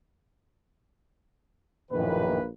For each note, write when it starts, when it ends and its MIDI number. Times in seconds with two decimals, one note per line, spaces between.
1.91 2.47 34
1.91 2.39 42
1.91 2.39 45
1.91 2.39 51
1.91 2.47 58
1.91 2.47 71